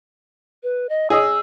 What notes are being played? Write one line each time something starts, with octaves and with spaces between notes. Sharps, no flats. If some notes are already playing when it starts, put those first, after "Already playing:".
B4
D#5
G#4 D#5 D#6 E6